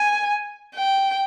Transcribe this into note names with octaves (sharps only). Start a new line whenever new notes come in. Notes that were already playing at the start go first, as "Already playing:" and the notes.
Already playing: G#5
G5